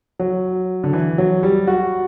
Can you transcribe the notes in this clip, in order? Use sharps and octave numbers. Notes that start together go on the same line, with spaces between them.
F#3
D3
E3
F#3
G3
F#4